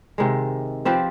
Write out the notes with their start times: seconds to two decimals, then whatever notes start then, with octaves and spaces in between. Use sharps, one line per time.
0.18 C3 D#3 G#3
0.85 F3 C4 G4 B4